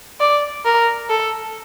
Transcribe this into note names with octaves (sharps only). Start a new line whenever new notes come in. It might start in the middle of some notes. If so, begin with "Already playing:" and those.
D5
A#4
A4